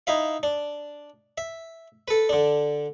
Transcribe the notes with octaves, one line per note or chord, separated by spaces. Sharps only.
D#4 E4 E5 F5
D4
E5
A4 B4
D3 D4